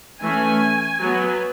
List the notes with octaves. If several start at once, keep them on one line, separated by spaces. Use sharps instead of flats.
E3 A3 C#4 G#5
F#3 B3